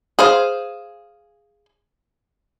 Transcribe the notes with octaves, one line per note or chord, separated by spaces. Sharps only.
G#4 C5 F5